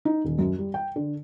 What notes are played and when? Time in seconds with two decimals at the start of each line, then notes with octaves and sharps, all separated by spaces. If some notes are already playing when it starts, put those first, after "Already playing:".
0.05 D#4
0.25 D#1
0.39 F#2
0.59 G3
0.74 G5
0.96 D3